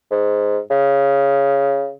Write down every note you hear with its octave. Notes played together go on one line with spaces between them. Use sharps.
G#2
C#3